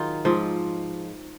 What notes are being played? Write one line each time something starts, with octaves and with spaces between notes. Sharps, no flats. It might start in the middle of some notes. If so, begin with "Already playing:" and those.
Already playing: D#3 F#3 D#4 F4 G#4
G#2 F3